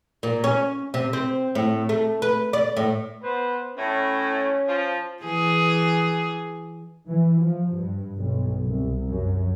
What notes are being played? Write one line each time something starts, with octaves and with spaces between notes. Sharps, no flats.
A#2
C#4
C3
C4
A2
A3
B4
D5
A2
B3 B4 C5
A2 C#4
F3
E3 G#4
E3
F3
G2
B1
C2
F#2